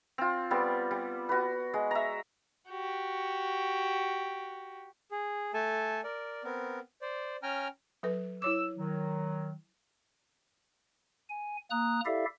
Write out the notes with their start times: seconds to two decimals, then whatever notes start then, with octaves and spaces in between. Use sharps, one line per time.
0.18 C4 F4
0.51 G3 B3 C4 D5
0.91 G3
1.29 F#4 B4
1.74 G#3
1.91 E5 A#5
2.69 F#4 G4
5.11 G#4
5.54 A3 A4 G#5 A5
6.04 A#4 D5
6.44 B3 C4 A#4
7.02 C5 D5
7.43 C#4 G5 G#5 A#5 F6
8.03 F#3 A4 B4
8.42 E4 C#5 D6 E6
8.77 D#3 F#3
11.30 G#5
11.70 A#3 A#5 D#6 F#6
12.05 E4 G4 A4 D5 E5 F5